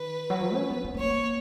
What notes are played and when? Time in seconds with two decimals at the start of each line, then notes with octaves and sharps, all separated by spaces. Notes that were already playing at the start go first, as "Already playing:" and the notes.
Already playing: D#3 B4
0.30 F#3
0.40 F3
0.55 C#4
0.70 B3
0.84 B3
0.94 B3
0.99 A#3 C#5